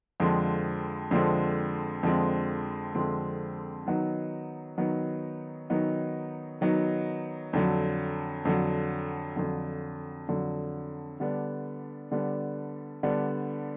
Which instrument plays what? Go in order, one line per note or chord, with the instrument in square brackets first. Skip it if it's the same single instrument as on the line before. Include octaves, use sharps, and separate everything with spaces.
[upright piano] F2 D3 F3 G#3 C4
F2 D3 F3 G#3 C4
F2 D3 F3 G#3 C4
F2 D3 F3 G#3 C4
D#3 F#3 B3 D#4
D#3 F#3 B3 D#4
D#3 F#3 B3 D#4
D#3 F#3 B3 D#4
F2 D3 F#3
F2 D3 F#3
F2 D3 F#3
F2 D3 F#3
D3 G3 B3 D4
D3 G3 B3 D4
D3 G3 B3 D4